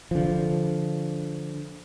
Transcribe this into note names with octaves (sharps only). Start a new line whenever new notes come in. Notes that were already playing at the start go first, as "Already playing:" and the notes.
D3 F3